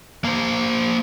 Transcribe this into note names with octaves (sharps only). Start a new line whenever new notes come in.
A#3 C5